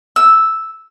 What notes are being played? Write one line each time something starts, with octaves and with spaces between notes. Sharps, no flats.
E6